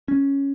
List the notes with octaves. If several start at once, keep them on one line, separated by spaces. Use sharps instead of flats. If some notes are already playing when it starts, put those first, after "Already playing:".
C#4